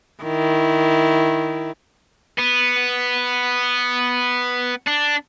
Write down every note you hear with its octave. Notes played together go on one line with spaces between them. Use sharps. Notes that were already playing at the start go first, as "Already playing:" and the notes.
D#3 E4
B3
D4